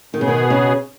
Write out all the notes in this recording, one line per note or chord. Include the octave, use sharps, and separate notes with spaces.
B2 D#3 B3 G#4
C#3
D#3
C#3